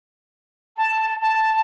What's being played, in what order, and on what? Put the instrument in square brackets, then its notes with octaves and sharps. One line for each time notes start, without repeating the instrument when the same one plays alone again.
[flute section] A5
A5